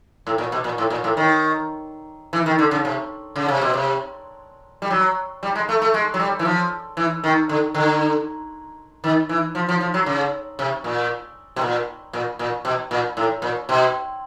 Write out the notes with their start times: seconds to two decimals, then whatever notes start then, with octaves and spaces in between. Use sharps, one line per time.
0.27 A2
0.38 A#2
0.52 B2
0.64 A#2
0.78 A2
0.90 A#2
1.04 A2
1.17 D#3
2.33 E3
2.46 D#3
2.59 D3
2.71 C#3
2.85 C3
3.36 C#3
3.48 C3
3.62 B2
3.74 C3
4.82 G3
4.90 F#3
5.43 G3
5.55 G#3
5.69 A3
5.82 A3
5.94 G#3
6.14 F#3
6.20 G3
6.39 E3
6.45 F3
6.97 E3
7.24 D#3
7.49 D3
7.74 D3
9.04 D#3
9.29 E3
9.55 F3
9.69 F3
9.81 F3
9.94 F#3
10.06 C#3
10.59 C3
10.84 A#2
11.56 B2
11.61 A#2
12.13 A#2
12.39 A#2
12.65 B2
12.91 A#2
13.17 A2
13.42 A#2
13.69 B2